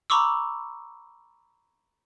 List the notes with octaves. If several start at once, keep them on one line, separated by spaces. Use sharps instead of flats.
A#5 B5 C#6 D6 E6